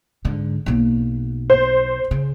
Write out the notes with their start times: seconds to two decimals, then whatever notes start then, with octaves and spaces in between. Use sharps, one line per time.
0.25 G#2 D3
0.66 B1 A#3
1.50 C5
2.11 C#3